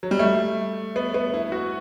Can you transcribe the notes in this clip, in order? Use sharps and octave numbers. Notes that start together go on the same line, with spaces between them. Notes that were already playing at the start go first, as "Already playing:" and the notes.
F#3
G3
A3
B3
B3
E4
F#4